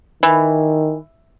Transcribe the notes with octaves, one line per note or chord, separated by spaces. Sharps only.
D#3 E3